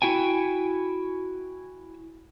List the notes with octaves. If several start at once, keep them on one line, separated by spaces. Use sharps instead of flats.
E4 F#4 G5 G#5